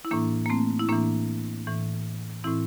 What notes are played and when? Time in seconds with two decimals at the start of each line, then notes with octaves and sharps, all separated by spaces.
0.05 E4
0.11 A2 E3 A#3 D4
0.46 A#3
0.50 A3 C4
0.80 E4
0.89 A2 E3 A#3 D4
1.67 A2 E3
2.44 A2 E3 C4 E4